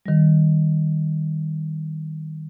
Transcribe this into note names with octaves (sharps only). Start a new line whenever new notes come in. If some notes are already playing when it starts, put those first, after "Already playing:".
D#3 G3